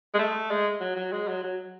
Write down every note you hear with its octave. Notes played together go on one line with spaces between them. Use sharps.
G#3
A3
G#3
F#3
F#3
G#3
F#3
F#3